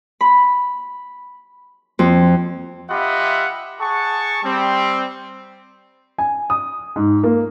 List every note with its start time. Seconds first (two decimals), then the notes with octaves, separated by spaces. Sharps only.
0.21 B5
1.99 F2
2.90 F4 G4 D#5 E5 F#5 B5
3.80 G#4 F#5 A5 C#6
4.43 G3 C4
6.18 G#5
6.50 D#6
6.96 G#2
7.23 A#3